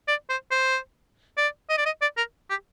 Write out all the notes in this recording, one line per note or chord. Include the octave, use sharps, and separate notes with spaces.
D5
C5
C5
D5
D#5
D5
D#5
D5
A#4
G4